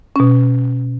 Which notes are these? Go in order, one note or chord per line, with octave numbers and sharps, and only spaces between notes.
B2 C#4